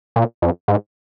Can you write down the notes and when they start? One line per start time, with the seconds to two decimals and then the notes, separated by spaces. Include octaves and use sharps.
0.16 A#2
0.42 F2
0.68 G#2